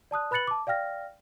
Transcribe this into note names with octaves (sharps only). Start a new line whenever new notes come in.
D5 A5 D#6 F#6
B4 B5 F#6 A6 C#7 F#7
A5 D6
D5 F5 G5 F6 A#6